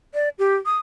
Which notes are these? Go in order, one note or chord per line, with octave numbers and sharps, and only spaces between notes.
D5
G4
D#6